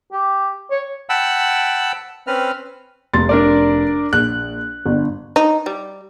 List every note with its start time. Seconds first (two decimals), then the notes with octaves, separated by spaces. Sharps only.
0.13 G4
0.71 C#5
1.09 F#5 G5 A5 B5 E6
2.27 C4 C#4 B4 F6
3.14 F1 C6 A6
3.29 D4 A#4 D5
4.13 A#1 F#6
4.86 G1
5.36 D#4
5.66 G3